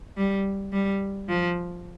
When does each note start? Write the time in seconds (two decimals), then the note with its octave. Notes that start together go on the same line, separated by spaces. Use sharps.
0.17 G3
0.73 G3
1.29 F3